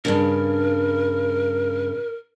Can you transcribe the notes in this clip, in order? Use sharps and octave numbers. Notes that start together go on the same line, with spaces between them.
G2 A#2 C#3 A#4